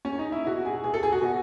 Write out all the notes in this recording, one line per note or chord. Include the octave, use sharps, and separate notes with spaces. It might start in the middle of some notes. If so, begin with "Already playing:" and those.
C#4
D#4
E4
B2 F#4
G#4
B2 G#4
A4
G#4
F#4
B2